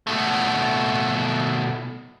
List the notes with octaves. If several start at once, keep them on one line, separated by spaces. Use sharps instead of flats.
B2 A3